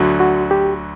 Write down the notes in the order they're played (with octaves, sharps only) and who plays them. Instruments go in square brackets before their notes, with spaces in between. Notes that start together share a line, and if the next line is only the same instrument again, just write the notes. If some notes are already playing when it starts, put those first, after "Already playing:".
Already playing: [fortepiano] D2 D3 F#3
[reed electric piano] F#4
G4